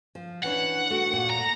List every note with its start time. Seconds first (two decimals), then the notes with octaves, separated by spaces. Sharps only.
0.15 F3
0.44 E3 C#4 D4 F#5
0.90 A3 F#4
1.11 D#2 A#2
1.30 A#5